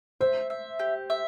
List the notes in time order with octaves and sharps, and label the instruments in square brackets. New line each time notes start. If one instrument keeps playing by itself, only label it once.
[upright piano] C5 [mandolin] E5
[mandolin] E5
G4
E5